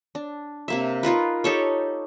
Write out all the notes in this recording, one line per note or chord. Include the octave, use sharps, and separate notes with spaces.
D4
C3 A#3 E5
D#4 F4 A#4 B4
D#4 G4 A4 C#5